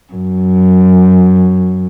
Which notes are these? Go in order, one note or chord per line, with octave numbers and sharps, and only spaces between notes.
F#2